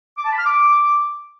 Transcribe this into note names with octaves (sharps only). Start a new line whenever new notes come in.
D6
A5
B5
F6
D6